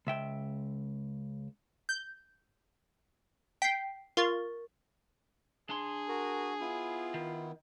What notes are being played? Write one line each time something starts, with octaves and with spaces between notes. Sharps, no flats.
C#2 E5 G5
G6
G5 B6 C7
F4 A#4 C#6 A6
D4 G#4 C6
F#4 A#4
B3 E4 F4
D#3